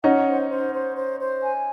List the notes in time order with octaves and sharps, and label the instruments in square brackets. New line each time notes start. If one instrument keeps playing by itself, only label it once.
[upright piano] C#4 D#4 [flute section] F#5
[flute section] C5
C5
C5
C5
C5
G#5